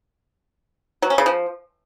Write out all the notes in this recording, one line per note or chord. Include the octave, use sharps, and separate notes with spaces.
F#3
C#4
C#3
F3